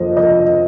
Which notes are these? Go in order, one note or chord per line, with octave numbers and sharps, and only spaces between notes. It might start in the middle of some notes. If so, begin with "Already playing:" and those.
Already playing: F2 F3 A#3 C5 D#5
D#5